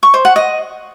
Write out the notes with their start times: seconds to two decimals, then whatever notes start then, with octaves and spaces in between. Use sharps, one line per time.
0.03 C#6
0.14 C5
0.25 F#5
0.36 D#5